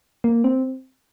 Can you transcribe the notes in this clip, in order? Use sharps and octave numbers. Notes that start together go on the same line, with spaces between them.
A#3
C4